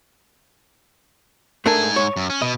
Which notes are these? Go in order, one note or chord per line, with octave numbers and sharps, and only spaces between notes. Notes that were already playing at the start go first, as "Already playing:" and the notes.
G#2 A3 D4 A#4 G#5
C#5
F#2
C#4
B2 D#5